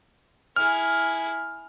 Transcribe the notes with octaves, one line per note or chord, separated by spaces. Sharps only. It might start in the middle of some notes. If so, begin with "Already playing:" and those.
E4 G#4 F6